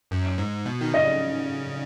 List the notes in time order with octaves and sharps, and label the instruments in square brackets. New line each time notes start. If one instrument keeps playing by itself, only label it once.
[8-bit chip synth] F#2
G#2
B2
D#3
[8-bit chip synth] C#3 [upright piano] D#5